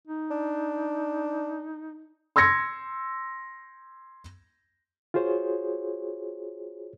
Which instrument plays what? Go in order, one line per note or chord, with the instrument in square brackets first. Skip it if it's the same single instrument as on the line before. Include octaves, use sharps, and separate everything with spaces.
[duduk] D#4
[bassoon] D4
[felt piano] C6 E6 G#6 A#6 C#7
[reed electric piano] F4 F#4 G#4 C5 C#5